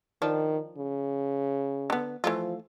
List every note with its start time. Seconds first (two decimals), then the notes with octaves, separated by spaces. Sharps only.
0.22 D#3 F3 D4
0.78 C#3
1.90 D3 B3
2.24 E3 F3 A3 F4